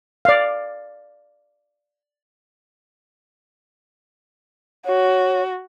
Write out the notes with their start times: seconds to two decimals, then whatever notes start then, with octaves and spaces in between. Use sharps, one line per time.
0.25 D5 F5
4.86 F#4 C#5